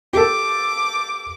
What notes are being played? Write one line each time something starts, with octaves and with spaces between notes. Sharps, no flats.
G4 A4 D6